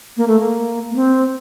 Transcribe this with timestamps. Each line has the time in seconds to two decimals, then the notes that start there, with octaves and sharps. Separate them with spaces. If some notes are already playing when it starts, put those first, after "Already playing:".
0.17 A#3
0.28 A3
0.39 A#3
0.91 A#3
0.96 C4